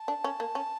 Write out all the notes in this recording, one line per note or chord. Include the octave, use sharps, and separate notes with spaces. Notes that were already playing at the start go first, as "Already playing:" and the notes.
Already playing: A5
D4
C#4
A#3
C#4